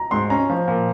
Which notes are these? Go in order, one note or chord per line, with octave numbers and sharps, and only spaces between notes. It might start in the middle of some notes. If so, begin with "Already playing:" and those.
Already playing: A#5
G#2 C6
C#4 A#5
F3
A#2